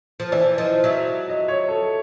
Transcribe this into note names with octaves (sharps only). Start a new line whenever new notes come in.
F3
E3 D5
F3 D#5
F#3 E5
D#5
C#5
A4